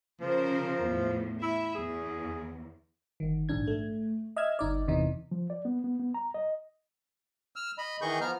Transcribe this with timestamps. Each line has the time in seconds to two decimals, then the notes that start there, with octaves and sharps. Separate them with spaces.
0.21 C#3 F3 A#4 C5
0.85 E2 A2
1.42 E4 E5
1.75 E2 G#4
3.20 G1 D#3
3.49 A#1 G#2 D4 G#6
3.67 A3
4.36 D#5 E5 E6 F6 G#6
4.59 G1 D#4 D5
4.88 E2 C3 E3 D#4
5.32 F3
5.50 D5
5.65 B3
5.84 B3
5.99 B3
6.14 A#5
6.34 D#5
7.56 E6 F6
7.78 D#5 B5
8.01 D#3 E3 G#4 D#5 C#6 G6
8.21 F3 B3 A#5 F6